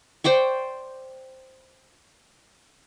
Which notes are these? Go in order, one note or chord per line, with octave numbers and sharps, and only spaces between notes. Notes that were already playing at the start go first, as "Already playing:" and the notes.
C5 D5 G5 C#6